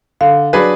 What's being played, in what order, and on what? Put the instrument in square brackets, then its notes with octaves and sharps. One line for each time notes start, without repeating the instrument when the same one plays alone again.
[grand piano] D3 [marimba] F5
[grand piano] F#3 D4 G#4 B4